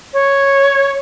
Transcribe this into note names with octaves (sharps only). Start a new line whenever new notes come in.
C#5